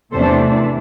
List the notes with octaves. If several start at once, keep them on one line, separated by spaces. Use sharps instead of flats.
E2 C3 E3 A3 D4 A4 C5